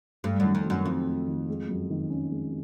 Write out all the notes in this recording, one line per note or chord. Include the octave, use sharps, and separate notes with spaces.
G2 A3
F#2 D#3
F2
F#3
F#2
F2 C4
A3
D#3
G#3
F#2
D#3
C#4
G#3